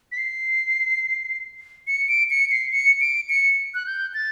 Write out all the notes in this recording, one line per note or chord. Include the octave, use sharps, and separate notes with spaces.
B6
C7
C#7
D7
C#7
C7
C#7
D7
C#7
F#6
G6
A6